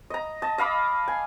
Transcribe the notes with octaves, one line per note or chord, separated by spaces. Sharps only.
D#5 A#5
D#5 A5
D#5 F5 B5 D6
G#5